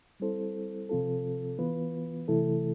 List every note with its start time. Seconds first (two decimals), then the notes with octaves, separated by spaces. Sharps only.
0.20 G3 C4 E4 A4 C5
0.89 C3 F3 C4 F4 A4
1.58 E3 B3 F4 B4
2.28 C3 E3 A3 E4 A4